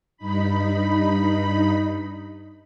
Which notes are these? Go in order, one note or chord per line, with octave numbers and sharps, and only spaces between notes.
G2 D#4 B5